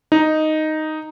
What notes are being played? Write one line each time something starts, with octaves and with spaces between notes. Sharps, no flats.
D#4